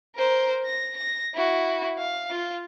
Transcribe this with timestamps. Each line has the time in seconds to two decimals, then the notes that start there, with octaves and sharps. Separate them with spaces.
0.16 A#4 C5
0.66 A#6
0.97 A#6
1.34 E4 F#4
1.99 F5
2.31 F4